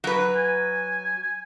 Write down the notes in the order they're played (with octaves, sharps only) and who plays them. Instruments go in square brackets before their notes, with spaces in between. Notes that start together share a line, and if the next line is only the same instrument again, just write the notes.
[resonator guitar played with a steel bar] F#3 B4
[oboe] G#5